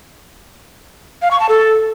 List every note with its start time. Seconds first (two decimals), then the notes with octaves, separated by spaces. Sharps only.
1.22 F5
1.31 C#6
1.40 A5
1.49 A4